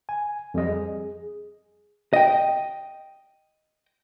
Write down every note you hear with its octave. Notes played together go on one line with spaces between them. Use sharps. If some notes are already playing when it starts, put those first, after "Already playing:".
G#5
F2 G3 D#5
G#4
D#5 G5